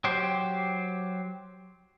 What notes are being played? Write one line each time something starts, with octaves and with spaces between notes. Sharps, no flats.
F#3 G4 C5